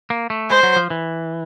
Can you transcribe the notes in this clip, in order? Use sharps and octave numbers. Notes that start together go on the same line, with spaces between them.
A#3
A3
G#3 C5
F#3
F3
E3